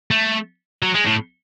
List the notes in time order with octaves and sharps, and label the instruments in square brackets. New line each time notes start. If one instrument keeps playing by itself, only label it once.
[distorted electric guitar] A3
F#3
G#3
A2